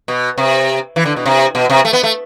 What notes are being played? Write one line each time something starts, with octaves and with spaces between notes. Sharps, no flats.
B2
C3
E3
D3
B2
C3
B2
C3
A3
B3
A3